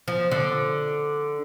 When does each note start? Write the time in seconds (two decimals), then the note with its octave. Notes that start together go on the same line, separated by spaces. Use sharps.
0.08 F3
0.31 D3